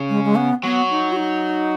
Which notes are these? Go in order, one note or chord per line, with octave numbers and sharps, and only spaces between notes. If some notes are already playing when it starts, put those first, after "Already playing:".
Already playing: C#3
G#3
G#3
B3
F#3 B3
D#4
F#4
D#4